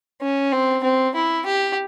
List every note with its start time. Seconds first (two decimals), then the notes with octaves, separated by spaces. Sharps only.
0.21 C#4
0.52 C4
0.83 C4
1.15 E4
1.46 G4